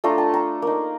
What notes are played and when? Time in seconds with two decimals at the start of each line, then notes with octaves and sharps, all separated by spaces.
0.04 A3 D4 F4 A#5
0.18 A5
0.34 A#5
0.62 A#3 D#4